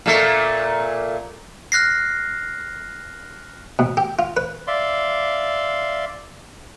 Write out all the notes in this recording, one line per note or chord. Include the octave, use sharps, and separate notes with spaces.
A#2 A3
F6 F#6 A#6 C7
B2
G4
F4
B4
D5 E5 F5 C6